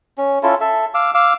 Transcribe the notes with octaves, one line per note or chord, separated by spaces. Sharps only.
C#4
C#4 E4 F4 A4
A4 E5
F5 D6 E6
F5 D6 E6